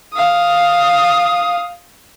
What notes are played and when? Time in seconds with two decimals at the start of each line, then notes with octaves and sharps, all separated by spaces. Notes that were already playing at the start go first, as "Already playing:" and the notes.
0.14 F5 D#6